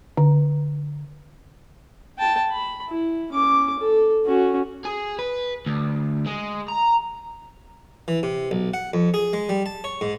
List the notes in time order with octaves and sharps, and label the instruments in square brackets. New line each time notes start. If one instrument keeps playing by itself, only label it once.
[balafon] D3
[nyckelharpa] G5 A5
B5
E4
C#4 D6
A4
C#4 F#4
[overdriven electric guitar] G#4
B4
D2
G#3
A#5
[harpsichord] E3
C3
B1
F#5
F2
G#4
G#3
G3
A5
C#5
G#2